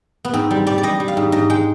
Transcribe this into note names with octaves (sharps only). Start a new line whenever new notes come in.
B3
G#2 C4
G3
G3 D5
D5
G3 D#5
G3
F5
G#2
G#2 D#5
G#3 G5